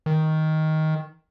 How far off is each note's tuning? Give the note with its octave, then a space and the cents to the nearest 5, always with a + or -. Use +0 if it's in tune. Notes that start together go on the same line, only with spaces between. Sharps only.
D#3 +10